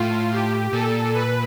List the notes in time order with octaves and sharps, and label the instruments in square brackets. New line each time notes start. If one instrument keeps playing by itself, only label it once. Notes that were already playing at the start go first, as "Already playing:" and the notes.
Already playing: [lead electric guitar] A2 [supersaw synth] F4
[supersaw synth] G4
[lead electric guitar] A#2 [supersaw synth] A4
[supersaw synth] B4